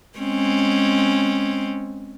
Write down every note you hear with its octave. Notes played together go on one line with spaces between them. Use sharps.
G#3 C4 C#4